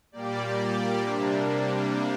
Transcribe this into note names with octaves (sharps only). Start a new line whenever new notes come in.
A#2 G3 A#3 G4 D5
C3 G3 A#3 D4